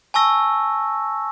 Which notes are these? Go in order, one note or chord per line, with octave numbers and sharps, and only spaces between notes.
G#5 A5 C#6 E6 A#6